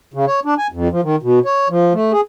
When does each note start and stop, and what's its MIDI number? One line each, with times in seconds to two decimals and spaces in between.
0.14 0.25 49
0.27 0.40 73
0.45 0.54 62
0.59 0.67 80
0.72 0.88 41
0.92 1.01 53
1.03 1.16 51
1.23 1.39 47
1.46 1.68 73
1.70 1.93 53
1.93 2.12 57
2.12 2.21 68